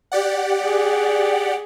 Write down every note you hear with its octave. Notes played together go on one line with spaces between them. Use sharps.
G4 D5 F#5
G#4